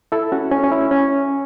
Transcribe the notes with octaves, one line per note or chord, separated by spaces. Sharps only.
E4 A4
C#4 F#4
C#4
C#4
E4
C#4